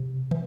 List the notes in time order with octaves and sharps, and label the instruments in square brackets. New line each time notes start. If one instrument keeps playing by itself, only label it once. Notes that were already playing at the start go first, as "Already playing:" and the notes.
Already playing: [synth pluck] C3
E3